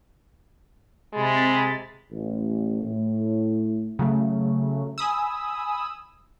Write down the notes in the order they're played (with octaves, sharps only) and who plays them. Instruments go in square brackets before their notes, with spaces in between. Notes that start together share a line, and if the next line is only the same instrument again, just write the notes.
[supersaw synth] C3 B5 A6 [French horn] G#3
[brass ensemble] A1
A2
[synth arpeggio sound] C#3 F#3 A3
G#5 B5 D#6 E6